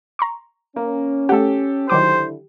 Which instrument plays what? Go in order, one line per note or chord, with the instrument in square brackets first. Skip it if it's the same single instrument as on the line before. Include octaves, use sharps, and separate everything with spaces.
[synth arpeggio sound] A#5 C6 C#6
[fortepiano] A#3 [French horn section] C#4
[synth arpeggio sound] A3 F#5 [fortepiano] G4 A4
[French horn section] D3 E4 [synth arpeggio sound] D#3 F#3 D6 [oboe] C5